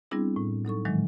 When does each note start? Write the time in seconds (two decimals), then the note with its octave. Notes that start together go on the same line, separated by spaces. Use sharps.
0.11 G3 B3 C4 D4 E4 G#4
0.36 A2
0.65 F#3 D#4 A4 C#6
0.85 A#2 D#3 E3 F#3 G#3